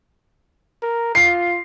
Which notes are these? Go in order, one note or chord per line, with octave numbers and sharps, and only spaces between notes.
A#4
F4 C7